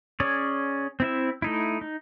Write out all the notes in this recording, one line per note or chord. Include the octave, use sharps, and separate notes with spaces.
C#4 G#4 C#5 D5
C4 E4 E5
A3 D#4 E4
D#4